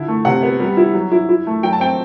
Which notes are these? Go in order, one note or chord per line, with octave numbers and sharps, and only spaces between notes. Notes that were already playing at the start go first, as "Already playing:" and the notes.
Already playing: D3 E4
A3
C3 F#5
B3
G3
E4
F#3
E4
E4
A3
F#3 G5
A5
C4 G5